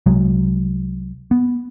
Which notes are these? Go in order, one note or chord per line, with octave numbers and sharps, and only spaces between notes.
C2 F#3 G#3
B3